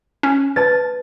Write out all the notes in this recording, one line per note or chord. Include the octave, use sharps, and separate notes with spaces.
C#4
B4 C#5 A5 A6